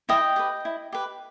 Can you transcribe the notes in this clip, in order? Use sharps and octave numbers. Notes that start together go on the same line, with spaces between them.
E4 D#5 G5
G4 B4
E4
G4 B4